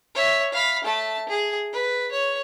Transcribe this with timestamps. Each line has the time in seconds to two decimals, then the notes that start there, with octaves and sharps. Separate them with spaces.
0.15 C#5 E5
0.53 F5 B5
0.84 A3 A5
1.29 G#4
1.72 B4
2.11 C#5